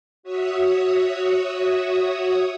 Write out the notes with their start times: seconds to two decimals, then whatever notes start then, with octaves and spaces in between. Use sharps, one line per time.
0.23 F#4 C#5 E5 D#6